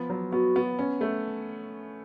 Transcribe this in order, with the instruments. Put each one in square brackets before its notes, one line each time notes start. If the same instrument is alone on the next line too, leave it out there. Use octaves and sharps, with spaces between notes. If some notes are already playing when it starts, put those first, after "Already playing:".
Already playing: [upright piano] F3 B3
F#3
[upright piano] B3 [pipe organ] F#4
[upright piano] B3
C#4
A3